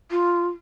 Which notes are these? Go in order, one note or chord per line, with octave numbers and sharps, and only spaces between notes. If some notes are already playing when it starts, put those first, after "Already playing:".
F4